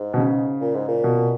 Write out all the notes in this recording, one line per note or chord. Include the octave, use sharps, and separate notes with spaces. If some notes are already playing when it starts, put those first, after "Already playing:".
Already playing: G#2
B2
C#3
A#2
G#2
A#2
B2